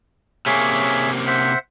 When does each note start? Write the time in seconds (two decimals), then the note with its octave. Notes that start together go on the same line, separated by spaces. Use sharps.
0.46 C3 A#3 C#4 G#4 C#5 E5
1.27 C5 E5 F#5